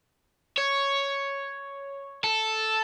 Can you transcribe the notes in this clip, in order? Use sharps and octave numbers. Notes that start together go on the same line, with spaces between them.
C#5
A4